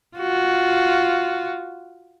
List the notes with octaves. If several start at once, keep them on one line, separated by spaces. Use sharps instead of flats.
F4 F#4